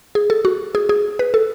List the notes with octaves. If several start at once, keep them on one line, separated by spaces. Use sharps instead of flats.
G#4
A4
F#4
G#4
G#4
B4
A4